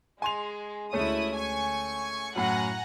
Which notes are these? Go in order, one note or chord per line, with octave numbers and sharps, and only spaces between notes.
G#3 G#5 C6 F7
D2 G#3 A3 C#4 E4 D#6
G#5 C#6
F#2 A2 F#5 G#5 A#5